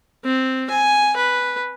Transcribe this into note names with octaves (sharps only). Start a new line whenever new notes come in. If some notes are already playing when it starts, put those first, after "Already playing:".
C4
G#5
B4